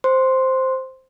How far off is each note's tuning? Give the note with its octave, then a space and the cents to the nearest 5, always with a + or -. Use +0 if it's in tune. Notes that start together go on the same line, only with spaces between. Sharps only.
C5 +0 C6 +0